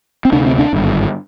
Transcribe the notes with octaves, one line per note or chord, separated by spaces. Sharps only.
C4
D2 C3 D4
C4
D4
G#1 G2 D3